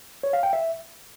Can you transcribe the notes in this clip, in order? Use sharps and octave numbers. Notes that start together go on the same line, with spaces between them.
C#5
F5
G5
E5